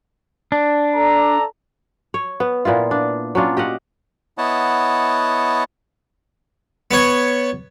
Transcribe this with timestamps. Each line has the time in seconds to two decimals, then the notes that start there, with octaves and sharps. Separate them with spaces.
0.52 D4
0.95 A4 D5 A#5
2.14 C#5
2.40 B3
2.65 A#2 B3 E4 F4
2.91 D4
3.35 F#3 C#4 D4 F4
3.57 G4 D#5 F5 F#5
4.38 B3 E4 C#5 D#5 F#5 A5
6.91 B3 C#5